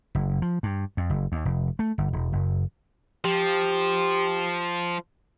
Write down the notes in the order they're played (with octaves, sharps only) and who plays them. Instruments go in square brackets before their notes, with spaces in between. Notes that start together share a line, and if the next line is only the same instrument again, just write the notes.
[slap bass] F#1
F3
G2
F2
F#1
D#2
F1
A3
G1
E1
F#1
[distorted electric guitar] F3 [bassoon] G4